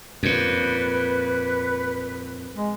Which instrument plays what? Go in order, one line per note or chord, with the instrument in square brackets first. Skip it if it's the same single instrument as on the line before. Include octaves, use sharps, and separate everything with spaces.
[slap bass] F2 A#2 [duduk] B4
[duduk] G#3